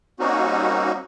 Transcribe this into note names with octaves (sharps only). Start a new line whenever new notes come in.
G3 A#3 C4 C#4 D#4 F#4